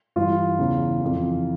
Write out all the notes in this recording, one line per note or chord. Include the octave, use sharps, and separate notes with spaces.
G2 E3 F4
E2 C#3 E3
F2 E3